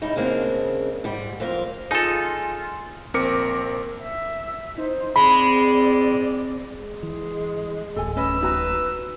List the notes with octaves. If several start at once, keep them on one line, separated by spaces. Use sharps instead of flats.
G#2 C#3 D#4 E4
C#3 G#3 A#3 C4 D4
G#2 G3 D5
F2 C4 A#4 F5
D#4 F4 G#4 A4
A#1 C4 A#4 D6 C#7
E5
D#4 C5
G#3 C4 D5 B5
G#3
E3
D1 A1 A4 G#5
C#4 B4 D#5 E6
D#4 F#4 B4 A#5